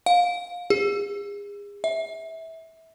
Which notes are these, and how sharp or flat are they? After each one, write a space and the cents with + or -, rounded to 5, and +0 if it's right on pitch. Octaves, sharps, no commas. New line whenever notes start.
F5 +25
G#4 -35
E5 -20